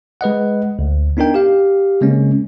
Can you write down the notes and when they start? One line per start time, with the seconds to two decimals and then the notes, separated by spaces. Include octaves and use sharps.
0.21 G#3 B4 D#5 F#5
0.79 D2
1.17 B3 D4 D#4 A#4 G5
1.34 G4 F5
2.01 C#3 G#3 A#3 C4 C#4